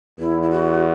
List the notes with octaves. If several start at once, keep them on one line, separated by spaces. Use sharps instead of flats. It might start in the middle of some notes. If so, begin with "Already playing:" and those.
E2 E4
E4
F#4